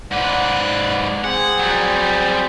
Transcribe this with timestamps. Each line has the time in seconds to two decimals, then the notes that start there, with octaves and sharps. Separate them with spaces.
0.11 G#2 B4 D5 F#5 F#6
1.24 C4 G#4 F#5
1.59 F#3 G3